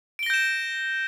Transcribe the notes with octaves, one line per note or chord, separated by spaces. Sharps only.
G6 A#6 D7 E7 G7